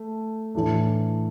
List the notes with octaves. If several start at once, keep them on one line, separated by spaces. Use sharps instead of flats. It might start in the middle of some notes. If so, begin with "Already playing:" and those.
Already playing: A3
A2 E3 A3 D4